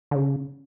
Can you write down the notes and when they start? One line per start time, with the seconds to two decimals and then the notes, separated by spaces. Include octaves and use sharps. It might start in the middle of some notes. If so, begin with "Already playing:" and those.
0.11 D3
0.15 C#3